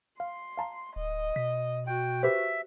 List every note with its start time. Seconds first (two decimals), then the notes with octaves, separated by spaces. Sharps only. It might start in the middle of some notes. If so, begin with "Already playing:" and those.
0.20 F5 C6
0.58 F5 A5 A#5
0.96 D1 D#5
1.36 B2 B6
1.87 F#4 G5
2.23 G4 B4 C5 E5